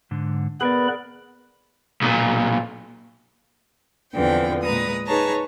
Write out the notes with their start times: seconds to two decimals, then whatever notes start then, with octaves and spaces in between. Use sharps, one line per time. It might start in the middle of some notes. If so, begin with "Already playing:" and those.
0.11 G#2 D3
0.61 B3 G#4 A#4 B4 D5 B5
2.01 B1 A#2
4.14 E2 D3 E3 F3 C4 G5
4.62 A#2 G#3 B4 A#5 D#6
5.06 D#4 G#4 B4 C#5 A5 A#5